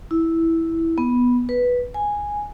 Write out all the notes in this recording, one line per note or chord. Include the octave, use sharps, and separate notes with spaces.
E4
B3
B4
G#5